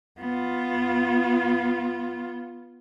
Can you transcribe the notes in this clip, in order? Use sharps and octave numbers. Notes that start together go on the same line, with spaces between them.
B3 F4